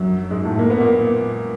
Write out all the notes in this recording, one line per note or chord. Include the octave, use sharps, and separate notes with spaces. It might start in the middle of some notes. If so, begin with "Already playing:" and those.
Already playing: F#2 F#3
G#2 G#3
A2 A3
A#3
B3
A#2 A#3